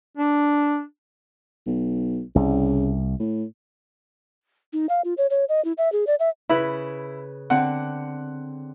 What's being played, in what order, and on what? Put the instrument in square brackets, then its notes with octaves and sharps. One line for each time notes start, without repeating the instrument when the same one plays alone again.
[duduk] D4
[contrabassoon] B1
[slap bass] C2 [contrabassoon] C#3
[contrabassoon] A2
[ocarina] D#4
F5
F4
C#5
C#5
D#5
E4
E5
G#4
D5
E5
[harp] C#3 B4 [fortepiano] E4
[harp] D3 C4 [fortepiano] F#5